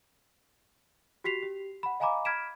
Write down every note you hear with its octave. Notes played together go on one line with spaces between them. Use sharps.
F#4 G4 B6 C7 F7
G4
F#5 B5
D#5 F5 G#5 A#5 B5 D6
B5 F6 G#6 B6 D7 E7